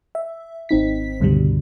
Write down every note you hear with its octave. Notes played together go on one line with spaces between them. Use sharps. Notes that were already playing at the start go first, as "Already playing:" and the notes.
E5
G#1 C4 D#4 B6
C#2 G2 B2 D3 G3